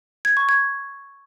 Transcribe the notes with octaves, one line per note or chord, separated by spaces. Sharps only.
G#6
C#6
G#6